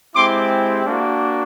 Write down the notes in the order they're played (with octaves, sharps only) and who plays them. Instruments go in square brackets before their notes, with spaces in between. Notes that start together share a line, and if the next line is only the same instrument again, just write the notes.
[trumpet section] G#3 C4 E4 G4 C6 D6
A#3 D4 F#4